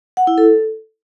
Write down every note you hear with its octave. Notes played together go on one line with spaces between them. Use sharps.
F#5
E4
A4